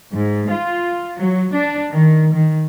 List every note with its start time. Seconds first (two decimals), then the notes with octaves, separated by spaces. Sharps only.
0.12 G#2
0.50 F4
1.17 F#3
1.54 D4
1.90 D#3
2.34 D#3